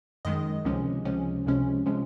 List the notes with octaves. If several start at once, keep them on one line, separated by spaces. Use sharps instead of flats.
F#2 D#3 G#3 D#5
C#2 C3 F3 G#3 C#4
C#2 C3 F3 G#3 C#4
C#2 C3 F3 G#3 C#4
C3 F3 G#3 C#4